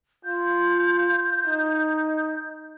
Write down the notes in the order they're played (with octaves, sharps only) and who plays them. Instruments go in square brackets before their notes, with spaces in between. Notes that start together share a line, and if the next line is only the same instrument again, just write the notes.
[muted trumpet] F4 [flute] G6
[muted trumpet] D#4